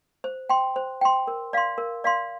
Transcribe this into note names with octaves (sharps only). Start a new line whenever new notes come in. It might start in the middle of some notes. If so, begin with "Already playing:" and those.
C5
G5 C6
C5
G5 C6
A#4
D5 F5 C6
A#4
D5 F5 C6